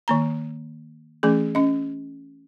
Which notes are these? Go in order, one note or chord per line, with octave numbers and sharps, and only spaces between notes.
D#3 A#3 A#5
E3 A3 C#4 G#4
C#4 D#5